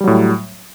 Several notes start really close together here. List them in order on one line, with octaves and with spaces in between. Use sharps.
G3 F#3 A2